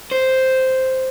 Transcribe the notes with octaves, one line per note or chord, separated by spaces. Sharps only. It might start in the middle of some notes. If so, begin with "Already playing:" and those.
C5